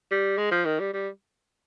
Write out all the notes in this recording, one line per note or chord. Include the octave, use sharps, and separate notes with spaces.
G3
G#3
F3
D#3
G3
G3